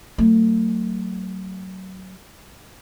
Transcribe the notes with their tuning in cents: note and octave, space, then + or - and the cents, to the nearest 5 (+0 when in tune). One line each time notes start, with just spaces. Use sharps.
F#3 +20 A3 +40